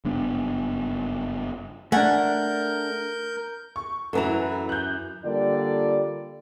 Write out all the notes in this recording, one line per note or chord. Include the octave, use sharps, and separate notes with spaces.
F#1 G2 B3 D4
A3 D4 A#4 F#5 G#5 G6
C#6
F#2 E3 E4 A4 B4 A#5
F#6 G6
D3 G3 A#3 F4 D5